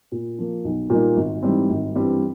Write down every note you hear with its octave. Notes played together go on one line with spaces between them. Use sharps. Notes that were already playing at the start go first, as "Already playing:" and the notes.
A#2
F3 A#3
B1
A#2 G3 A#3 D#4
G#1
G#2 E3 G3 C4
G#1
G2 E3 G3 C4